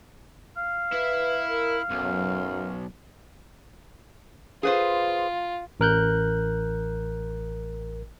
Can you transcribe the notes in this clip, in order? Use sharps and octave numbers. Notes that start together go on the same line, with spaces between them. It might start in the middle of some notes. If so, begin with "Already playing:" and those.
F5
E4 B4 E5
A#4
B1 F#2
F4 G#4 B4 C5
A1 A#4 F#6 G6